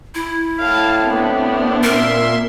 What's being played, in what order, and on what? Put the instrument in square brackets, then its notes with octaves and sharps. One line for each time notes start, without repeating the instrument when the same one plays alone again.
[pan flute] E4
[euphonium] A2 [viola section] F5 A5
[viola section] B3 C4 D4
[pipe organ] A#2 E5 C6 [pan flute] A#4